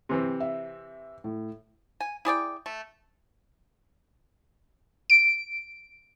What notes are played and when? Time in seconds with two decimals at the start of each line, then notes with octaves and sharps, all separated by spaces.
0.09 C3 E3 C4
0.40 E5
1.24 A2
2.00 G#5
2.25 E4 G#4 D5 G5
2.66 A3
5.10 D7